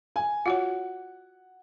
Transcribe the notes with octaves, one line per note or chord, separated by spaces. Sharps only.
G#5
F4 F#4 C#5 F#5